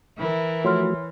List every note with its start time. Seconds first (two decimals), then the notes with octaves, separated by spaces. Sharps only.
0.18 E3 E4 A#4
0.65 F3 A3 F#4 C#5 C6 F6